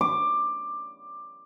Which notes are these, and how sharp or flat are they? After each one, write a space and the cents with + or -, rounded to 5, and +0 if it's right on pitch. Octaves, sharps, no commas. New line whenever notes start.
D6 +15